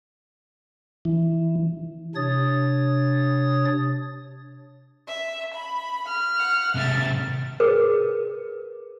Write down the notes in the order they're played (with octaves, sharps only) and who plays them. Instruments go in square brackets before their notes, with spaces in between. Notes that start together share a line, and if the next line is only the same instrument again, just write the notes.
[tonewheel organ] E3
[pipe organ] C3 D4 C#5 D#6 A6
[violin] E5
B5
[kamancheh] F6
[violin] F#5
[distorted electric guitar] G#2 C3 [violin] E5 A6
[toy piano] G#4 A#4 B4